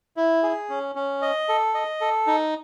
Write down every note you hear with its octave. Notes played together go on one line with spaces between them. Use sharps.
E4
G#4
C#4
C#4
D#5
A4
D#5
A4
D#4